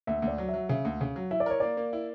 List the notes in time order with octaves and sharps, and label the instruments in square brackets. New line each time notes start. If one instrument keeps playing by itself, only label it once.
[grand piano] D2 [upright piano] E5
[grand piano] D2
[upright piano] D5
[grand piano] F#3
[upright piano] E5
[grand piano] F#3
[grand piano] C#3 [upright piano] E5
[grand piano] D2
C#3
F#3
[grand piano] E4 [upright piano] E5
[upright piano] D5
[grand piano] A#4 [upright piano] C#5
[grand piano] A#3 [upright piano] D5
[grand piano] A#3
E4